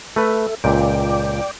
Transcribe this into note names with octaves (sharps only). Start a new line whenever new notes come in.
A3 A4 B4 E5
C#2 A#2 D5 G5 D6